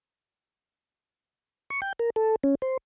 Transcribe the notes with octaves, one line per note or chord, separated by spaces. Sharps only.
C#6
G5
A#4
A4
C#4
C5